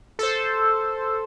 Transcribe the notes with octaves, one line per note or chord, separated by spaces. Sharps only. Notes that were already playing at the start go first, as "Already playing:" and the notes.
A4 C5